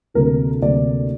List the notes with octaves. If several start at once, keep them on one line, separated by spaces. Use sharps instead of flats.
D2 C3 F#3 A#3 A#4
D2 C3 F#3 A#3 D5